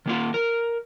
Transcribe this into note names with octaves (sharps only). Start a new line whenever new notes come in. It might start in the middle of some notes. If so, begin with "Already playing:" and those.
D#3 A#3 F4
A#4